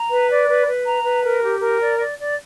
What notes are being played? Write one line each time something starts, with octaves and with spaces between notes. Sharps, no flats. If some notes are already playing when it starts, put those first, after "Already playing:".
Already playing: A#5
B4
D5
B4
B4
A#5
B4
A#4
G4
A#4
D5
D5
D5